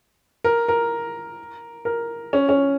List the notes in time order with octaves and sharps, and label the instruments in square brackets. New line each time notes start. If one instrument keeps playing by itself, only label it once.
[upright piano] A#4
A#4
A#4
C#4
C#4